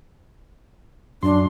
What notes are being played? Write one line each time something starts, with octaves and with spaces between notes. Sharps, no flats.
F#2 D4 C6